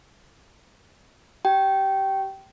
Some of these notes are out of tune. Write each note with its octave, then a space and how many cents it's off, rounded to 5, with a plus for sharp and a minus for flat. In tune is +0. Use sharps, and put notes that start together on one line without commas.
G4 -20 G5 -20